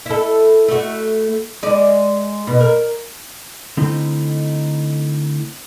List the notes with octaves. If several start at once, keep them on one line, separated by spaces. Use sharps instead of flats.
E4 A4
A3 F#4
G#3 D5
B2
A#4
D3 A3 C4 D#4 E4 D#5